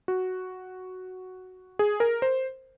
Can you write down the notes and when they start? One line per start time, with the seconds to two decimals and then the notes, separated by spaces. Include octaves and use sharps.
0.08 F#4
1.79 G#4
2.00 A#4
2.22 C5